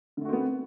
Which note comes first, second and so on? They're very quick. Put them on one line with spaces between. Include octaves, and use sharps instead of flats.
D3 A3 F#4 C4 B3